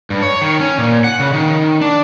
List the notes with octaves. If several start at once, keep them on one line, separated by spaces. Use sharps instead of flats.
G2
C#5
D#3
C#4
A#2
F#5
C#3
D#3
D4